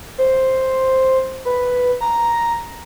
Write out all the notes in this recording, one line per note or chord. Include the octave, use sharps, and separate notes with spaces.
C5
B4
A#5